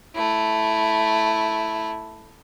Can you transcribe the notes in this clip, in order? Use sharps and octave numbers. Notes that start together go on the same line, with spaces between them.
A3 E4